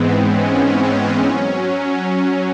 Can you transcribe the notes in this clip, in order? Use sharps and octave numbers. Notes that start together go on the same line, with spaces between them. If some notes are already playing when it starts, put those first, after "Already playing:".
Already playing: G#2 E3 G#3 B3 C4
C#4
F#3